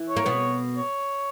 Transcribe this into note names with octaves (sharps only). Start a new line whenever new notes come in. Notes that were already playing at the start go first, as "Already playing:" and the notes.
Already playing: E3
C#5
A#3
B2 B3
C#5